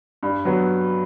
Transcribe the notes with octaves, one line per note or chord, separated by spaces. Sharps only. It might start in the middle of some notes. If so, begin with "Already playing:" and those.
G2
F#3 B3